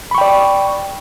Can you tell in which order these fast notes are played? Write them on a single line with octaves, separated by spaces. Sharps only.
B5 C#6 G5 D5